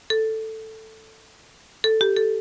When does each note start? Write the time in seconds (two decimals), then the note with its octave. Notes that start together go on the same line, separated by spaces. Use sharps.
0.10 A4
1.84 A4
2.01 G4
2.17 A4